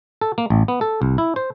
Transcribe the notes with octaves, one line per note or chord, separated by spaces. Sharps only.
A4
A#3
A1
B3
A4
C2
E4
C5